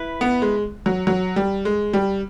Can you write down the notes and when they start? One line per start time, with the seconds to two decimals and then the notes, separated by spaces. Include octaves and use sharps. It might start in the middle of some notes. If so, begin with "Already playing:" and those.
Already playing: E4 B4
0.21 B3
0.42 G#3
0.86 F#3
1.07 F#3
1.36 G3
1.65 G#3
1.93 G3